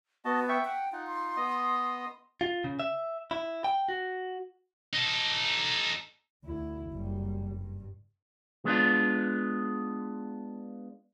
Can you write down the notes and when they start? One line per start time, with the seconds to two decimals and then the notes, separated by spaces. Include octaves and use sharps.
0.25 B3 F#4 D#5 A5
0.49 E5 G5 C#6
0.65 F#5 G5
0.92 D#4 F4 F#5
1.07 C6
1.37 B3 D#5 D#6
2.41 F4
2.64 C#3
2.79 E5
3.31 E4
3.64 G5
3.89 F#4
4.93 D#4 A4
6.45 D2 E4
6.92 F#1 G3
7.54 G2
8.65 G#3 B3 D4 F4